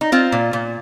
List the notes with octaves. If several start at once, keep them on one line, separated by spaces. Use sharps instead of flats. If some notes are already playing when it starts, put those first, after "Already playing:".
D#4
C4 F4
A#2
A#2